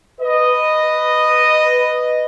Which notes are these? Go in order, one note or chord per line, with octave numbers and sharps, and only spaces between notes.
B4 D#5